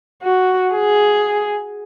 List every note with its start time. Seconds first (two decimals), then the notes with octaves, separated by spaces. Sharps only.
0.23 F#4
0.74 G#4